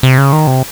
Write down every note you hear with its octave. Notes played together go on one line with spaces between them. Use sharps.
C3
C#3
D#3
C3